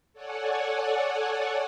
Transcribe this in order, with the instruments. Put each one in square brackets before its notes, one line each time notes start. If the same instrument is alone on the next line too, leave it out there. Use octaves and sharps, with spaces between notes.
[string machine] A4 C#5 D5 F#5 G#5